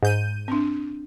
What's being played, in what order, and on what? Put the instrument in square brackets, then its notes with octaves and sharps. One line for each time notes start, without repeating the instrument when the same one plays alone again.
[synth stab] G#2 G6 D#7
[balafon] C4 D4